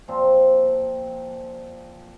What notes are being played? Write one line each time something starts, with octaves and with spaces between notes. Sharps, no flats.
A#2 F3 C4